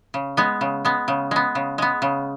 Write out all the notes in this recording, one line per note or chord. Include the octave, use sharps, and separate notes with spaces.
C#3
G#3 B3
C#3
G#3 B3
C#3
G#3 B3
C#3
G#3 B3
C#3